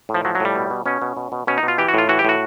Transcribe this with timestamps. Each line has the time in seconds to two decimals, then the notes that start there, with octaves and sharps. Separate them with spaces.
0.09 A2
0.14 F3
0.25 F3 F#3
0.35 F#3
0.40 A2 G3
0.55 B2
0.70 B2
0.86 B2 C#4
1.02 B2
1.17 B2
1.32 B2
1.47 B2 C#4
1.58 D#4
1.63 B2
1.68 F4
1.78 E3 G4
1.88 F#4
1.94 A2 F4
2.09 E3 F#4
2.19 G4
2.25 A2 F#4